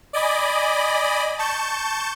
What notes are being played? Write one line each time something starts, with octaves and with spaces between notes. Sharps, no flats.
D5 D#5 G#5 B5
A5 C#6 G6